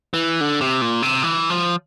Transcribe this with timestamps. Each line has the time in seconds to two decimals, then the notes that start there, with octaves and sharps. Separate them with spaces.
0.14 E3
0.41 D3
0.61 C3
0.82 A#2
1.02 C3
1.23 E3
1.50 F3